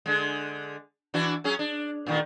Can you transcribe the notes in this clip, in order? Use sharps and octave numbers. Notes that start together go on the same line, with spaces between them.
D3 G#3
E3 D4 F#4
F#3 C#4 G#4
D4
A#2 D#3 A3